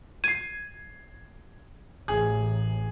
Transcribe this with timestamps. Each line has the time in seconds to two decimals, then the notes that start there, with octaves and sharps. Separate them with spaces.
0.24 G#6 C7 D#7
2.08 A1 G#4